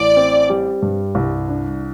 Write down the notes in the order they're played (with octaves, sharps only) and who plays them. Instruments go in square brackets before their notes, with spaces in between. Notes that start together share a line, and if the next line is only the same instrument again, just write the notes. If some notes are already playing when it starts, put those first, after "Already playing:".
Already playing: [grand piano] A1 [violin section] D5
[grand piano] C4
G3
G2
C2
D4